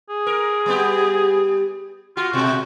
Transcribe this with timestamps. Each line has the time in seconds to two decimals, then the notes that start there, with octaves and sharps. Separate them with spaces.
0.10 G#4
0.26 A#4
0.66 G3 B3 G4
2.17 F4 F#4
2.33 B2 G#3 F#4